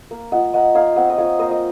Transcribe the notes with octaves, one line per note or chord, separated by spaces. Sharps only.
A#3
F4 D#5 F#5
A#3 D#5 F#5
D#4 C#5 F5
C4 D#5 F#5
D#5
F4 C#5 F5
A#3 C5 D#5
D#5